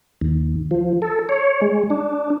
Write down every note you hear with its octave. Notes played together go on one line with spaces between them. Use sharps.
D#2
F3
A4
C#5
G#3
D4